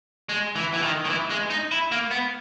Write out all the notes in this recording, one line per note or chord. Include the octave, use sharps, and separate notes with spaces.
G#3
E3
E3
D#3
D#3
E3
G#3
D#4
E4
A#3
B3